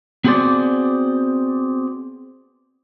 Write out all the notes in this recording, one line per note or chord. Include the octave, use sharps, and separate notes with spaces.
B3 C4 F#4 G#4 C5 D5